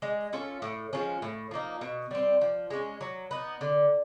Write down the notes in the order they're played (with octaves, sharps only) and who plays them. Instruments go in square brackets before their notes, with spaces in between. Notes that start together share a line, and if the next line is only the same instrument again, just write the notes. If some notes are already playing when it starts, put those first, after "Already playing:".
[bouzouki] G#3
C#4 F4 A4
A2
F3 G#3 C#4
A2
F3 A#3 D#4
B2
G3 C4
F3
G#3 C#4
F#3
B3 D#4
D3